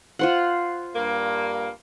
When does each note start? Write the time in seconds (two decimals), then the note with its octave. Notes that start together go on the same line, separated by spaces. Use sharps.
0.19 F4 C5 F#5
0.95 G2 A#3